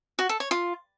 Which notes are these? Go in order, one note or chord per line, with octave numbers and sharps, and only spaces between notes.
F#4
A4
C#5
F4